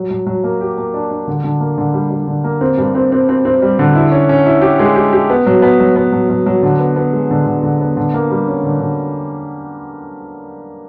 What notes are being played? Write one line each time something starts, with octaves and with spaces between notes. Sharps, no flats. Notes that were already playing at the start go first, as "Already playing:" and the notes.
Already playing: F#3
F#3
F#3
A#3
G4
A#3
D4
D4
D3
D3
A#3
D3
G3
G3
D3
A#3
C4
G2
C4
C4
C4
C4
G3
D3
E4
C#4
C#4
E4
G4
G#3
G4
G4
B3
F#3
B3
F#3
B3
F#3
F#3
F#3
D3
B3
B3
G#3
D3
D3
D3
B3
D3
A#3
G3
C#4
D3
D3